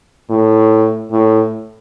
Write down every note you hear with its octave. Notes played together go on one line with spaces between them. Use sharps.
A2
A2